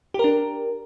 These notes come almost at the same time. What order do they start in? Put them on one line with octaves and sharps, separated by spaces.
G4 A#4 D4